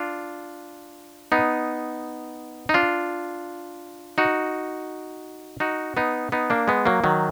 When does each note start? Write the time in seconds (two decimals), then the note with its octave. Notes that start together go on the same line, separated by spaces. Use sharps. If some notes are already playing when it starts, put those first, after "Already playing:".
Already playing: D4 F4
1.32 B3 D#4
2.69 D#4
2.74 D4 F4
4.18 D#4 F#4
5.60 D#4 F#4
5.97 B3 D#4
6.32 B3 D#4
6.50 A#3 D4
6.68 G#3 B3
6.85 F#3 A#3
7.04 D#3 F#3